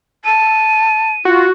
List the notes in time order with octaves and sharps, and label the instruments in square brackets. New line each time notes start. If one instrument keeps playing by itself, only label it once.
[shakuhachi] A5 [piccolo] D#7
[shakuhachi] F4 [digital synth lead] F#4